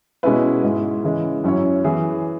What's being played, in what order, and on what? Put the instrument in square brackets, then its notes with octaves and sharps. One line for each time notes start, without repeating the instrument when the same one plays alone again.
[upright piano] B2 G#3 C#4 E4 B4
G#2 G#3 E4
C#3 E3 G#3
F#2 F#3 C#4 E4 C#5
E3 B3 G#4